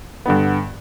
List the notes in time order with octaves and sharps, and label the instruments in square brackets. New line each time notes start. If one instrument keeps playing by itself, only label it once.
[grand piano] G2 D3 B3